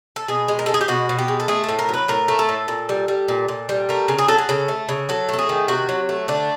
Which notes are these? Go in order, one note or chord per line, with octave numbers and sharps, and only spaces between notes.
A4
B2 G#4
G#3
A#4
G#3 A4
G#4
G4
B2 F#4
B2
G4
G#3
A4
A3 G#4
A4
A2
A#4
F#3 B4
A2 A#4
A3
A4
A2
A#2
G3
G3
A#2
A#2
G3
A3 A#4
C#3
G#4
F#3 A4
G#4
C#3 A4
A3
C#3
F#3 A4
A3 A4
G#4
D#3
C3 F#4
F#3
A3
D3 D4